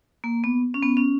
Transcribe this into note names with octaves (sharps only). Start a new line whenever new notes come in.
A#3
B3
C#4
B3
C#4